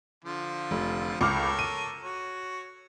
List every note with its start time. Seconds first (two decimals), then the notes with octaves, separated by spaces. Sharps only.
0.25 D3 F3 F4
0.71 F1
1.21 C#2 A4 A#4 C#5 D6 F6
1.59 D#7
2.04 F#4 C#5